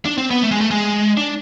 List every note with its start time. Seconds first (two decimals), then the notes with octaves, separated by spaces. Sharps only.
0.05 D4
0.18 C4
0.31 B3
0.43 A3
0.51 G#3
0.61 A3
0.71 G#3
1.17 D4